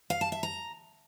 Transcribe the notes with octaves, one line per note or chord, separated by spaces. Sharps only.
F5
A5
E5
A#5